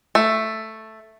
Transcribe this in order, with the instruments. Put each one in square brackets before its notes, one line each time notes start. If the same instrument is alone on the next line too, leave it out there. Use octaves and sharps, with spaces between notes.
[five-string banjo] A3